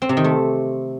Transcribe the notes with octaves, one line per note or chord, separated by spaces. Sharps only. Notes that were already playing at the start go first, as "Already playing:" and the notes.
C4
C3
D#3
A3